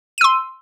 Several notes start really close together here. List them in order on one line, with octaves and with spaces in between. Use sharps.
D#7 E6 C6